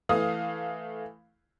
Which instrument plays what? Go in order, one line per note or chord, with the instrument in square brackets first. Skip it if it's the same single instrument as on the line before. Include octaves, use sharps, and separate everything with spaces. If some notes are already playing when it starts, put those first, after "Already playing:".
[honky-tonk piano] E3 A3 F5 D#6